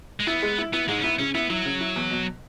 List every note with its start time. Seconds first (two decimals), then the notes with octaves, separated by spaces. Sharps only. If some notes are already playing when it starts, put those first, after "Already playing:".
0.20 G#3
0.27 B3 E4
0.42 G#3
0.58 E4
0.73 B3 E4
0.88 G#2 G#3
0.98 C#4
1.03 B3 E4
1.19 C#3 C#4
1.35 B3 E4
1.50 F#3 E4
1.65 C#3
1.81 E4
1.96 E2
2.11 B2